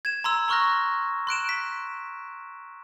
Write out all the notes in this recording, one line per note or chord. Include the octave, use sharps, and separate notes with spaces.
G#6 E7
A#5 C6 E6
A#5 C6 C#6 F6 F#6 A#6
C6 F#6 D7 E7
B6